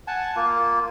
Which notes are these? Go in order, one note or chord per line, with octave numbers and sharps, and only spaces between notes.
F#5 G#5 A5
A#3 F4